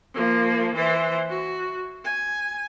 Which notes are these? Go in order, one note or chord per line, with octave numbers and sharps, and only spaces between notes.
F3 A#3
E3 C5
F#4
G#5